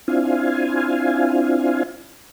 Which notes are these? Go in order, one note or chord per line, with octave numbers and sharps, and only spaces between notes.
C4 D4 E4 F4 F5 G#5